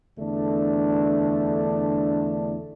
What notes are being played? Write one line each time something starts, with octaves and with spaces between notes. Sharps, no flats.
E2 D3 A3 D4